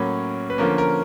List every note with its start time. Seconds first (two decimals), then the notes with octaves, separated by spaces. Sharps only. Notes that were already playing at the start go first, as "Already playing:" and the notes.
Already playing: A2 F#3 A#3 C#4
0.50 B4
0.58 D3 F3 A#3 C#4 A#4
0.78 A#4